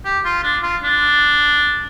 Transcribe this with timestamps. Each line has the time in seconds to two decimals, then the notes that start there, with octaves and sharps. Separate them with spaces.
0.05 G4
0.25 F4
0.43 D4
0.63 F4
0.83 D4